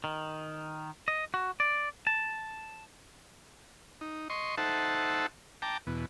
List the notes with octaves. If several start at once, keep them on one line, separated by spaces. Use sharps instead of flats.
D#3
D#5
F#4
D5
A5
D#4
D#5 C6 C#6
D#4 A4 C5 E5 F#5 A5
G5 A5 A#5 D6
E2 B2